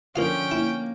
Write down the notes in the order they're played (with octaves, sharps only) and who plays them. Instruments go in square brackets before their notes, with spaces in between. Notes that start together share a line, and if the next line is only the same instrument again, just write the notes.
[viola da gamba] D3 F3 [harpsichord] A#3 F4 F5 [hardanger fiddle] C#4 G5
[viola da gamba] A#3 [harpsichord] E4